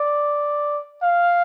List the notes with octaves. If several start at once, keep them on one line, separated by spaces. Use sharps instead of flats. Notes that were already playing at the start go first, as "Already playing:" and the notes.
Already playing: D5
F5